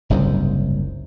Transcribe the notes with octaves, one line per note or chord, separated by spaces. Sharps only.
F#1 C2 G#2